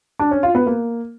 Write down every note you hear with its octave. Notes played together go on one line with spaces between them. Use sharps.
D4
C#4
F4
B3
A#3